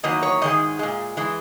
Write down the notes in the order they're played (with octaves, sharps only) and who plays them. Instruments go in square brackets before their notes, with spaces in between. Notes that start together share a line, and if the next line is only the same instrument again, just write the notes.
[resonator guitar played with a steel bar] E2 D#3 F#3 A#3 D#5
C#5
G#2 D#3 G#3 D#5
A#2 G#3
E3 G#3